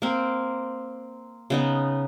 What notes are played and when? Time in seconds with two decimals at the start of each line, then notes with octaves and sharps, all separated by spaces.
0.02 A#3 C4
1.50 C#3 B3 D#4